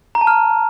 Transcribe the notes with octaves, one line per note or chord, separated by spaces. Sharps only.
A#5
A5
F6